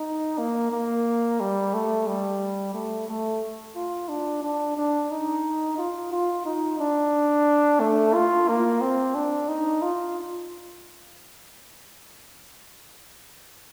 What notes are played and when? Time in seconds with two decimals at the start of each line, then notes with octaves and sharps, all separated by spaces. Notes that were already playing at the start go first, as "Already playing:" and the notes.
Already playing: D#4
0.38 A#3
0.71 A#3
1.40 G3
1.74 A3
2.07 G3
2.74 A3
3.08 A3
3.76 F4
4.09 D4
4.42 D4
4.77 D4
5.11 D#4
5.78 F4
6.12 F4
6.45 D#4
6.79 D4
7.80 A3
8.14 F4
8.48 A#3
8.81 C4
9.15 D4
9.49 D#4
9.82 F4